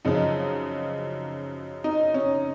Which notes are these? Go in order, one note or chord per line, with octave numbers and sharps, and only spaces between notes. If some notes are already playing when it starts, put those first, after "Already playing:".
F#2 C#3 F3 D#4
D#4
C#4